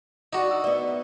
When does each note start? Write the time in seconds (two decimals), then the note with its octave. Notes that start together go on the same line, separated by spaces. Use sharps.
0.33 D4 D#4 F#4
0.51 E6
0.64 B3 D5 E5